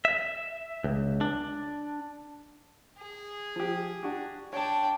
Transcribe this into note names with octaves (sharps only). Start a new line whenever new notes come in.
E5
C#2
D4
G#4
F3 G4
D4 F#4 G4
D4 C#5 G5 A5